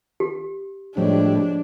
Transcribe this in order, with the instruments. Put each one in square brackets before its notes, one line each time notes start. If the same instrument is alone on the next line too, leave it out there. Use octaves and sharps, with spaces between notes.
[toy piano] G4
[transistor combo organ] A2 G3 [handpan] F3 G#3 C#5 [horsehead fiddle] D4